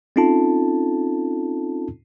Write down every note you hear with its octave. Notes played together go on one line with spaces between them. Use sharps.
C4 C#4 D#4 F4 A4 A5